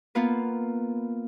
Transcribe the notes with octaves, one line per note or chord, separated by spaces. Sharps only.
A#3 B3 F4 B4